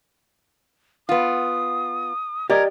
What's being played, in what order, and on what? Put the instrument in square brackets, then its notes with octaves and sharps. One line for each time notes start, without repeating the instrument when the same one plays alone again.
[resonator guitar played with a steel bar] B3 F4 [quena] D#6
[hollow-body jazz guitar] G4 D5 D#5 [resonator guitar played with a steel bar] A#4 [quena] G#6